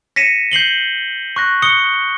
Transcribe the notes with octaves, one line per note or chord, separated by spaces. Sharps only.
A#6 B6 C#7 D#7 E7
G6 C7 F#7 G7
C#6 F#6 A#6
D#6 C#7 G7